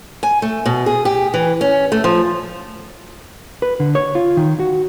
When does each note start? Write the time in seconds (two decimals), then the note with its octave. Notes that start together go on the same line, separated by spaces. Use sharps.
0.23 G#5
0.42 A3
0.66 B2
0.86 G#4
1.05 G4
1.34 E3
1.61 C#4
1.92 A3
2.04 F3
3.62 B4
3.80 D3
3.95 C#5
4.15 F4
4.37 D#3
4.60 F#4